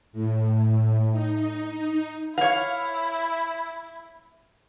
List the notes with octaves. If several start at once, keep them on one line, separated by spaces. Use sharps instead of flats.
A2
D#4
E4 C#5 F5